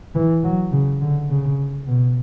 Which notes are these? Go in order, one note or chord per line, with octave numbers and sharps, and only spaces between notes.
E3
F#3
C#3
D3
C#3
B2